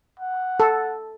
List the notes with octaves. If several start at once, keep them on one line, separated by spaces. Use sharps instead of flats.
F#5
A4